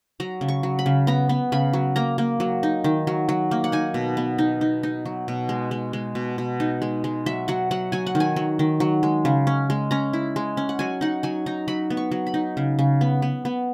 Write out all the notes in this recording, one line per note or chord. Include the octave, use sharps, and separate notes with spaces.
F#3 A#5
C#3
C#6
F#3
B5
C#3
B3 A#5
B3
C#3 B5
F#3
A#3 A#5
A#3
F#3
D#4
D#3
F#3
F#3
A#3
F#5
D#4 G#5
B2
B3
D#4
D#4
D#4
F#3
B2
G#3
G#3
G#3
B2
B2
D#4
G#3
G#3
F#3 E5
F#3 F#5
F#3 F#5
F#3 G#5
F#5
D#3
G#5
F#3
D#3
F#3
G#3
C#3
C#4
G#3
C#4 A#5
E4
G#3
C#4
F#5
F#3 G#5
D#4 F#5
F#3 G#5
D#4 A#5
F#3 B5
B3
C#6
F#3
B5
D#4
C#3
C#3
B3
B3
B3